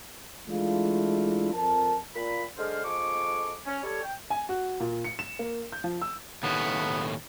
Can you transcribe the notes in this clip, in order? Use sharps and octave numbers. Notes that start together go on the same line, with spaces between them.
E3 G#3 A3 D4 E4 F4
F2 A#4 A5
A#2 B5
D3 G#3 C5 F6
F2 F3 G#3 A4 C#6 D6
C#4
G3 A4 C#5
G5
G#5
F#4
A#2
C#7
E7
A#3
G6
F3
E6
D#2 A2 B3